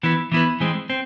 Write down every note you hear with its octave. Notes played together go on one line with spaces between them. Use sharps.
E3 B3 E4 B4
E3 B3 E4 B4
E3 G#3 C4
C4